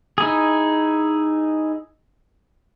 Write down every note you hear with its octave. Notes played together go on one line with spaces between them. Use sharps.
D#4 E4 G#4